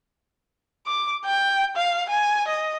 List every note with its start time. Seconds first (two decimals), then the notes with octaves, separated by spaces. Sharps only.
0.87 D6
1.25 G5
1.77 F5
2.10 G#5
2.48 D#5